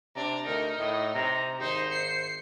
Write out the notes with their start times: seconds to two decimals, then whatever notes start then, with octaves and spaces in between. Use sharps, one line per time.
0.16 C3 D4 A#5
0.46 D2 D#4 A#4
0.79 A2 D#5
1.15 C3 A#5
1.60 G#1 D#4 C5 C6
1.91 C7 C#7